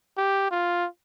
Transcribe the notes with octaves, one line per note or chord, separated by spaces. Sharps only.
G4
F4